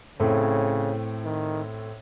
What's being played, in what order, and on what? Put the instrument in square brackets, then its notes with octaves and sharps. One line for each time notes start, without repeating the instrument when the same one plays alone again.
[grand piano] A2 A3 C4 [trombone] C#3
[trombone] D#3